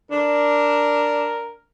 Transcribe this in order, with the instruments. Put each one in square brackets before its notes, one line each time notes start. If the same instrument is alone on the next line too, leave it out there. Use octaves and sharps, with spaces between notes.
[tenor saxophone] D4 [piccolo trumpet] A#4